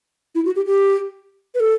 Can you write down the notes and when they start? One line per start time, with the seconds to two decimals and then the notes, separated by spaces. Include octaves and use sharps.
0.35 E4
0.45 F#4
0.56 G4
0.66 G4
1.55 B4
1.60 A4